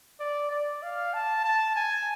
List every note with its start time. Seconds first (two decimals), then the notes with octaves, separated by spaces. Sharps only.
0.20 D5
0.51 D5
0.83 F5
1.14 A5
1.44 A5
1.76 G#5